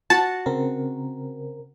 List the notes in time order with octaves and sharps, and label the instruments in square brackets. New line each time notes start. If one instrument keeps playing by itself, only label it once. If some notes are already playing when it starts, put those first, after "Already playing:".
[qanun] F#4 [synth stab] A5
[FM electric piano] C#3 C4 A#4